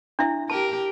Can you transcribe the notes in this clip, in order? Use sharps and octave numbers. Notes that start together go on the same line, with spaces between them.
D4 E4 E5
G4 A#4 A5